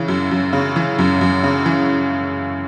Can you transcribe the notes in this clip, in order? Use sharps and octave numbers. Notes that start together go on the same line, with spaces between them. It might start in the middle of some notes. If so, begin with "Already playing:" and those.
Already playing: C#3 E3
F#2
F#2
C#3
E3
F#2
F#2
C#3
E3